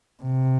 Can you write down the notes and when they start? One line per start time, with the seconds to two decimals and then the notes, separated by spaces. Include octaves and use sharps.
0.23 C3